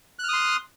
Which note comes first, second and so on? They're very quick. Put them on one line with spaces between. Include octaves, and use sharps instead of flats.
F#6 F6 D#6 C6